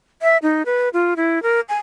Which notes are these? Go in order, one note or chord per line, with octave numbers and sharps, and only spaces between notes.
E5
D#4
B4
F4
E4
A#4
G#5